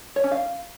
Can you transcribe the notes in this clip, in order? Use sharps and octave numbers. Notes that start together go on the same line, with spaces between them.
C#5
C#4
F5